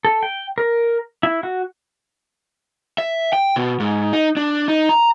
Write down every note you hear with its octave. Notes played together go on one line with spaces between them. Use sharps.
A4
G5
A#4
E4
F#4
E5
G5
B2
G#2
D#4
D4
D#4
A#5